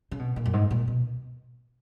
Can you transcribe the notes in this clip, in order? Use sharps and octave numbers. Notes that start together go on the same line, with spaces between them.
C#3
B2
A#2
F#2
G#2
A#2
B2